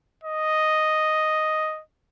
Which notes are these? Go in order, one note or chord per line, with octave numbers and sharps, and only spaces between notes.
D#5